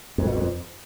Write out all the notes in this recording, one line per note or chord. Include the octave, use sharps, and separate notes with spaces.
F2
B2
F2